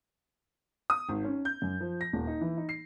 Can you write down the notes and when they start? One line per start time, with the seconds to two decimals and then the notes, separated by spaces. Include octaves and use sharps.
0.90 D#6
1.09 G#1
1.25 C#4
1.45 G6
1.62 F#2
1.80 F3
2.01 A#6
2.13 D#1
2.27 D#4
2.41 E3
2.57 D#4
2.69 C7